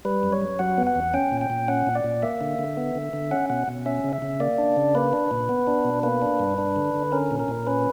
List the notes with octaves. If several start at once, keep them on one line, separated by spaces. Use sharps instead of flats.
G3 B4
F#2
C#5
F#2
F#3 F#5
B3
F#5
E2
C#4 G5
A#2
G5
A#2
C#4 F#5
A#2
D5
A#2
A#3 E5
D3
D3
B3
D3
D3
C#4 F#5
B2 F#5
B2
C#4 E5
C#3
E5
C#3
A#3 D5
D4
C#3
A#3 B4
D4
A#2
B3
D4
B2
A#3 B4
D4
G2
D4
D3
D3
C#4 A#4
A#2
A#4
A#2
C#4 B4